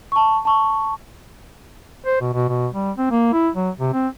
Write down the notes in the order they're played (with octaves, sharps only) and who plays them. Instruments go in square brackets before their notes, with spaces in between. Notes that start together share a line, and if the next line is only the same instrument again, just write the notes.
[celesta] A5 C#6
A5 C#6
[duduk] C5
B2
B2
B2
G3
C4
A#3
E4
F#3
C3
C4